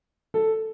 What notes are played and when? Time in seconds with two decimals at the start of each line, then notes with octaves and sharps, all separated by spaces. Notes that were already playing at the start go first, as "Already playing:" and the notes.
0.34 A4